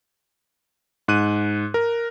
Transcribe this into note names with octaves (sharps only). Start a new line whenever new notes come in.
G#2 F#6 D#7
A#4